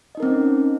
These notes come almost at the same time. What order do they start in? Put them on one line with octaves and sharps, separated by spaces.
D#5 D#4 A#4 C4 C#4